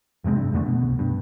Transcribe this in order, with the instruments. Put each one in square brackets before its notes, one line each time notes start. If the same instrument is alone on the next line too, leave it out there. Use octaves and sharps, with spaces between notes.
[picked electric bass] F1 C3 G#3 C4
G2
F2 D3 A3
B2
C2
G2